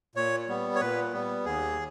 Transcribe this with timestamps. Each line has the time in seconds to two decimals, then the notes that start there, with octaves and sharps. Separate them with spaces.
0.16 A#2 C#5
0.48 G3 B3
0.75 C#5
0.81 A#2 B4
1.13 G3 B3
1.45 D#2 G#4